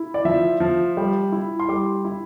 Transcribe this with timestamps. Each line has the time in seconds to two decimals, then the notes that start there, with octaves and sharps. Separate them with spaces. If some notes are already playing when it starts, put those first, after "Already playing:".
Already playing: E4
0.14 D5
0.25 F3 E5
0.60 F3
0.97 G3
1.32 E4
1.60 C6
1.69 G3 D6
2.05 E4